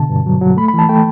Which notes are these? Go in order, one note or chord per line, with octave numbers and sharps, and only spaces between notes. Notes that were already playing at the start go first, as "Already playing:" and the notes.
Already playing: B2 D3 A5
G2
F#3
F#3
A3 B5
B5
E3 A5
A3 G5